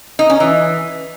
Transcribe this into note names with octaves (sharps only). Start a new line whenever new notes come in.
D#4
C#4
E3